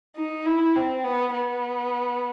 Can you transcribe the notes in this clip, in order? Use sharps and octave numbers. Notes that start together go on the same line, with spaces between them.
D#4
E4
C4
B3
B3